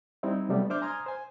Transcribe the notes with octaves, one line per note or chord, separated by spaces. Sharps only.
G3 C4 D#4 E4
C3 F#3 G3 A3 B3
D4 C5 E5 D6 F6 G6
G#5 A#5 C6 D#6 F6 G#6
C5 G#5